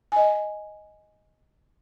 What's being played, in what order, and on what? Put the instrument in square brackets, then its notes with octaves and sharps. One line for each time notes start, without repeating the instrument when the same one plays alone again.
[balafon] D#5 G#5